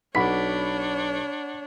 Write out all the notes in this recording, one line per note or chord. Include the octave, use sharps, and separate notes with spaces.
B1 D4 C#5 F#5 B5 B6